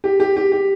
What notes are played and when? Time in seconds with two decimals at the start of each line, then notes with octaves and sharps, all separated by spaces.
0.04 G4
0.20 G4
0.36 G4
0.52 G4